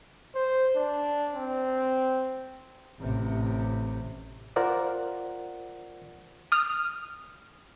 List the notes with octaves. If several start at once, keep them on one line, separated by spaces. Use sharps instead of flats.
C5
D4
C4
A1 C3
F4 A#4 C5 D5 F#5
D#6 F6